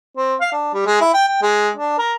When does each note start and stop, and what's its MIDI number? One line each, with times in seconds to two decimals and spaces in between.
0.17 0.35 60
0.41 0.49 77
0.52 0.73 62
0.74 0.82 55
0.86 1.01 56
1.01 1.10 64
1.14 1.28 79
1.28 1.37 79
1.42 1.69 56
1.77 1.98 62
1.99 2.13 70